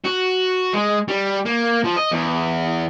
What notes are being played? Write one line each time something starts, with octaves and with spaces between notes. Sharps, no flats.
F#4
G#3
G3
A#3
F3
D#5
E2